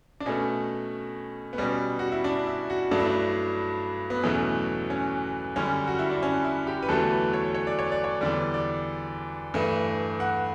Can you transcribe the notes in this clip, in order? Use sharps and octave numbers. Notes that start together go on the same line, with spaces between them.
D4
B2 A3 C#4
B3
B2 G3 C#4
F#4
E4
D4
E4
F#4
G2 F#3 A3 D4
E4
D4
B3
E2 B2 F#3 A3 C#4
C#4
F#2 D3 G3 C#4
F#4
E4
D4
C#4
E4
G4
B4
E2 D3 F#3 A3 A4
B4
C#5
C#5
D5
C#5
D5
C#5
E2 D3 G3 D5
D5
G2 E3 A3
F#5